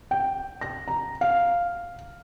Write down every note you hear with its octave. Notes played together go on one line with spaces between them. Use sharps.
G5
A#6
A#5
F5